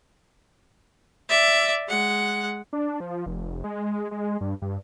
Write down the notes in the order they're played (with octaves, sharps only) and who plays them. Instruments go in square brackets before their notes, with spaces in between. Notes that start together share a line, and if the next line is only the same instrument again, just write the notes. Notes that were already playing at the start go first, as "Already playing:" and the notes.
[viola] D5 E5
G#3 F#5
[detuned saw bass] D4
F3
F1
G#3
G#3
G2
G2